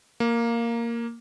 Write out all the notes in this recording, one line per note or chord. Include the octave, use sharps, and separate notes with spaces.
A#3